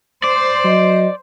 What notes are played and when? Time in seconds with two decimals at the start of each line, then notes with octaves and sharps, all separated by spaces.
0.24 C5 D5
0.64 F#3 D#5